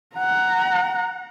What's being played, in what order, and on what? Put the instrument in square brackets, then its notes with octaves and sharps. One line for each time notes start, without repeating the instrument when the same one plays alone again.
[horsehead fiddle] F#5 A#5